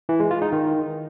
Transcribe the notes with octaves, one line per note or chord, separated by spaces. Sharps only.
E3
G#3
F4
D#4
D#3